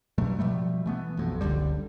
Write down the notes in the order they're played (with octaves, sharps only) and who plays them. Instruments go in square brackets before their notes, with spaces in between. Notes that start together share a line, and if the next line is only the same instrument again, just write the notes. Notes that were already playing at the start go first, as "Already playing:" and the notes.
[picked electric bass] G2 B2 F#3 A3
B2 F3 G3 A3
E3 A3 B3
B1 F2
F#1 C#2 D3 G3